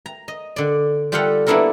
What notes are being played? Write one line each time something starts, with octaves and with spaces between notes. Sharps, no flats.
A#5
D#5
D3 D5
G3 F4 G4 A4 F5 F#5
A#3 B3 D4 E4 A4 A#4